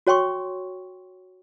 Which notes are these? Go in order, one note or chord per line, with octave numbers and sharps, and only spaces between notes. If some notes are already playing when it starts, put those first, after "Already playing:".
F#4 C#5 G5 C6 C#6